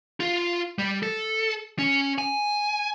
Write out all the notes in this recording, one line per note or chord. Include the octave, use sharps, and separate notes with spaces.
F4
G3
A4
C#4
G#5